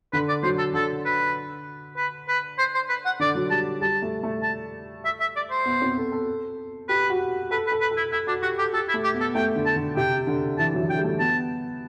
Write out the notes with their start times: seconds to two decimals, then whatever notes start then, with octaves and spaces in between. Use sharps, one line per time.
0.13 D3 B4
0.29 D5
0.43 F#3 C5
0.58 A4
0.73 D3 A4
1.05 B4
1.97 B4
2.28 B4
2.58 C5
2.74 C5
2.89 B4
3.05 F#5
3.20 D3 D5
3.35 F#3
3.50 G3 A5
3.81 G3 A5
4.02 A3
4.23 A3
4.43 A5
5.05 E5
5.20 E5
5.36 D5
5.51 C5
5.66 B3
5.82 C4
5.98 A4
6.12 A4
6.89 G4 B4
7.10 F#4
7.51 A4 B4
7.67 B4
7.72 A4
7.81 B4
7.91 A4
7.97 E4
8.12 E4 A4
8.27 D4 F#4
8.42 F#4 G4
8.59 G4 A4
8.73 G4 A4
8.89 E4
8.94 A3
9.04 G4
9.14 B3
9.20 A4
9.35 A3 G5
9.56 D3
9.66 A5
9.76 D3
9.97 C3 G5
10.27 D3
10.58 E3 A5
10.74 F#3
10.82 E3
10.89 D3 G5
10.99 G3
11.04 A3
11.19 B3 A5